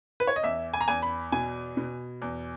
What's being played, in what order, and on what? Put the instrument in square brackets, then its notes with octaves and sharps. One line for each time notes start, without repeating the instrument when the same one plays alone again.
[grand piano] B4
C#5
D#5
E2 E5
G#5
A#5
E2 G#5
B5
B2 G#5
B2
E2